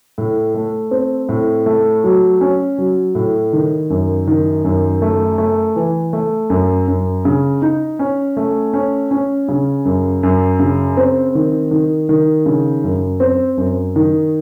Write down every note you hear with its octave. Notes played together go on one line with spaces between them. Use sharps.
A2
A3
C4
A2
A3
F#3
C#4
F#3
A2
D#3
F#2
D#3
F#2
A3
A3
E3
A3
F#2
F#2
C#3
D#4
C#4
A3
C#4
C#4
C#3
F#2
F#2
C#3
C4
D#3
D#3
D#3
C#3
F#2
C4
F#2
D#3